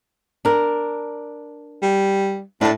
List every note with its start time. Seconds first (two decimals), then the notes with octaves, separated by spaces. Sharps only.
0.45 D4 A#4
1.82 G3
2.61 A2 D4 A5